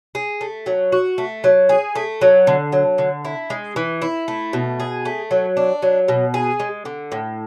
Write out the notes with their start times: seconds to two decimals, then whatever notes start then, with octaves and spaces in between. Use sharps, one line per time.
0.15 G#4
0.41 A3
0.66 F#3
0.92 F#4
1.18 A3
1.44 F#3
1.69 G#4
1.95 A3
2.21 F#3
2.47 D3
2.72 F#3
2.98 D3
3.25 E4
3.50 G#3
3.76 E3
4.02 E4
4.28 A3
4.53 B2
4.80 G#4
5.05 A3
5.31 F#3
5.57 D4
5.82 F#3
6.08 B2
6.34 G#4
6.60 G#3
6.85 D3
7.12 A2